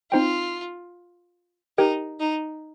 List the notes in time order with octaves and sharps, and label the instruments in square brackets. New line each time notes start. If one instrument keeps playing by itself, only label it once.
[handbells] C4 D#4 C5 G5 [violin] F4
[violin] D#4 [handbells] G4 A#4 G5
[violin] D#4